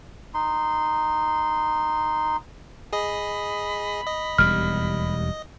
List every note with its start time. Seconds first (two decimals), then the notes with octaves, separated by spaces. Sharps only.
0.34 D#4 C6
2.93 G#4 D#5 B5
4.06 D#5
4.38 E1 D#2 G3 F6